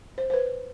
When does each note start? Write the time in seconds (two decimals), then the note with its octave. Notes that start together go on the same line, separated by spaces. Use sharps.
0.18 C5
0.30 C5
0.34 B4